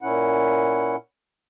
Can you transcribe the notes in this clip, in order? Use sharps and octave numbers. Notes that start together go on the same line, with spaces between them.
A#2 C#4 E4 F#5